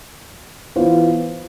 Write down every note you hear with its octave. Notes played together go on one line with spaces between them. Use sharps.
E3 B3 F4 C5